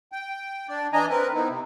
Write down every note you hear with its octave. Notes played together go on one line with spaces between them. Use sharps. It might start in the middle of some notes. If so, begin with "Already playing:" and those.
G5
D4 D5
E3 D4 D#5 G#5 A#5
C4 A#4 B4
B3 C4 D#4 E4
C3